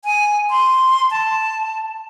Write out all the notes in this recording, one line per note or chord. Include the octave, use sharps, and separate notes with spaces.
G#5
C6
A5